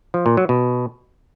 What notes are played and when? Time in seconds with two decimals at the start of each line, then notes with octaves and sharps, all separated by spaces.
0.14 F3
0.26 A#2
0.37 F#3
0.49 B2